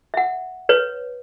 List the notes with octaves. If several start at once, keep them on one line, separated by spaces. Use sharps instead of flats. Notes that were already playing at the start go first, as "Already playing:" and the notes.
E5 F#5
B4 C#5